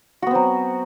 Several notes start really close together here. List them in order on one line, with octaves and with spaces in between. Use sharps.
F#4 B3 C4 F#3